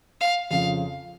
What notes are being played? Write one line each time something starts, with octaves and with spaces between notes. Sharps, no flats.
F5
F2 C#3 F3 F5